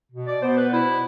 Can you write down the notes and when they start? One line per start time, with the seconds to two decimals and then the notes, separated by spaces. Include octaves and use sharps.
0.11 B2
0.26 D5
0.41 B3 C5
0.56 B4
0.71 B2 E4